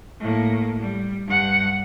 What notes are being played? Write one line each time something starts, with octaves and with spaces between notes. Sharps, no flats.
A2 A#3
G3
G2 F#5